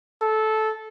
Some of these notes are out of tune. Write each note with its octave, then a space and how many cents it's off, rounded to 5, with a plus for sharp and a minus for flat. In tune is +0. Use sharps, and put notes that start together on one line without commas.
A4 -15